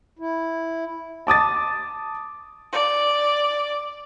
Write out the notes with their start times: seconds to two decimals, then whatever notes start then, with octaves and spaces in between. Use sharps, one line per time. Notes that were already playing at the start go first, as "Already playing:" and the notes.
0.19 E4
1.27 A5 D6 D#6 A6
2.72 D5